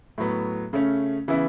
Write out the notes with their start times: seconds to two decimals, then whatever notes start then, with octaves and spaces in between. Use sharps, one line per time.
0.18 A2 F#3 B3
0.73 C#3 A3 C#4
1.28 C#3 E3 B3 E4